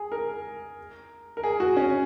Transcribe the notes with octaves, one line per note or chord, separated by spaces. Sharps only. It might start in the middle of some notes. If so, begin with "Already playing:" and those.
Already playing: G#4
A#4
A#4
G#4
F#4
C#4